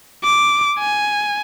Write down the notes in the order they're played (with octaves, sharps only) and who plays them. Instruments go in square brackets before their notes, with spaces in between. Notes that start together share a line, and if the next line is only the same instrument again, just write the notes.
[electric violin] D6
G#5